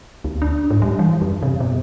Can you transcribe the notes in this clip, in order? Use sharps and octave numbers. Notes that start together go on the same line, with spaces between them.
D2
D4
G#2
G3
E3
F#2
C3
B2